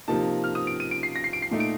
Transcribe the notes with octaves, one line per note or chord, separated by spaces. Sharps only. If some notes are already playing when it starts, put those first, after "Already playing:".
C3 F3 A#3 D#4 A5
F6
D#6
D7
D#7
D7
C7
A#6
C7
D7
C7
A#2 A3 D#4
D7